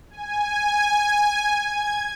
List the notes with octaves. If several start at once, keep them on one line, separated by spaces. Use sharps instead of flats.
G#5
G#6